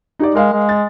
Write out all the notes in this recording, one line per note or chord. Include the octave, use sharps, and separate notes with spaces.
D#4 G4 D5
G#3 A#4 F5
G#3
A6